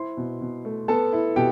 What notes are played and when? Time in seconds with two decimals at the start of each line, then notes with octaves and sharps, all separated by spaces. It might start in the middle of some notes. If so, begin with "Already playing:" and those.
Already playing: E4 C5 C6
0.17 B2
0.41 B2
0.65 A3
0.88 B3 A4 A5
1.13 E4
1.36 B2 G4 G5